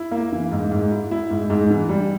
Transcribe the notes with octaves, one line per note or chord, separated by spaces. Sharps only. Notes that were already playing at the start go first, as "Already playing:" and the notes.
Already playing: E4
A#3
E3
G#2
G#2
E4
E4
G#2
G#2
E3
G3